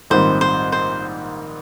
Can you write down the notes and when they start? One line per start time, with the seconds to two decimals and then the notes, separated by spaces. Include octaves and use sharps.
0.10 A#1 G#2 D#3 G3 C4 C5
0.41 C5
0.72 C5